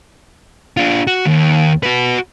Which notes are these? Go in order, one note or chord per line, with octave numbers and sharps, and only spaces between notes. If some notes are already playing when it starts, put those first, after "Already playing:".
D4 F4
F#4
D#2
F#4 B4